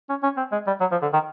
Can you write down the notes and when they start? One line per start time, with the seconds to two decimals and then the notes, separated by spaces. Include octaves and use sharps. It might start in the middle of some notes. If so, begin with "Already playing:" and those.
0.09 C#4
0.23 C#4
0.37 C4
0.52 G#3
0.67 G3
0.80 F#3
0.91 F3
1.02 D3
1.13 D#3